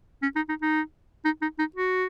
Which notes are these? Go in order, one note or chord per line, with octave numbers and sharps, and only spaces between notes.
C#4
D#4
D#4
D#4
D#4
D#4
D#4
F#4